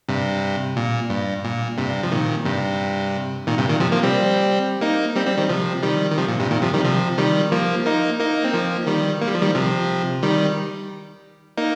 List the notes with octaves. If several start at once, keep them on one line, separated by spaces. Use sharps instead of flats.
G2 C3
A#2
G2
A#2
G2 C3
F3
A#2 D#3
G2 C3
A#2 D#3
G2 C3
A#2 D#3
C3 F3
F3 A#3
G3 C4
A#3 D#4
G3 C4
G3 C4
D#3 G3
C3 F3
D#3 G3
D#3
C3 F3
A#2
G2 C3
A#2 D#3
C3 F3
D#3 G3
C3 F3
D#3 G3
F3 A#3
A#3 D#4
A#3 D#4
C4
F3 A#3
D#3 G3
A#3
G3
F3
D#3 G3
C3 F3
D#3 G3
A#3 D#4